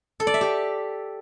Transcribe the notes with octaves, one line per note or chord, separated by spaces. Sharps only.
A4
D5
E5
G4